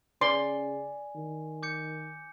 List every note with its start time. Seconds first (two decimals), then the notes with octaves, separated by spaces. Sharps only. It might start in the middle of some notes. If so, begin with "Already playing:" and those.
0.21 C#3 D5 G#5 C6
1.16 D#3
1.63 D6 G6 C#7